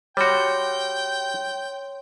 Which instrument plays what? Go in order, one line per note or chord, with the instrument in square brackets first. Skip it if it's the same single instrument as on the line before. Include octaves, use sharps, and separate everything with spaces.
[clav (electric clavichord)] G3 F#4 [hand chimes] C#5 C6 [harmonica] G5